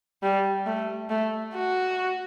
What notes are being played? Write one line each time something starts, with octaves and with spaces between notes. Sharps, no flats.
G3
A3
A3
F#4